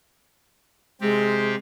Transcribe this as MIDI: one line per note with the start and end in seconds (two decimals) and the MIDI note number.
1.01 1.55 48
1.01 1.58 56
1.01 1.55 60
1.01 1.55 67